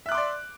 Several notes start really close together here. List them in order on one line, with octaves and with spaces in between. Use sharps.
E5 F#6 D6 C6 D5